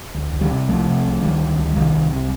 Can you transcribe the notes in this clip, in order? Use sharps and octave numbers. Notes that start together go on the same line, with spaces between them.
D2
D2
D#3 G3
C3
C2 F3 A3
C3
C2
D2 D#3 G3
D2
D2
C2 D#3 G3
C2
C3